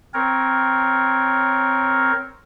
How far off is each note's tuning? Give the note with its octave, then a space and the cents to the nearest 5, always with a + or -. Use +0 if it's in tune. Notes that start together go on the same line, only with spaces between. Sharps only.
C4 +0 A#4 +5 C#5 +0